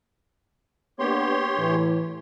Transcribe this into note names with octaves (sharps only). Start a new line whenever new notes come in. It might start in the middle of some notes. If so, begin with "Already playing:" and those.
A#3 B3 D4 G4 C#5 C6
A2 E3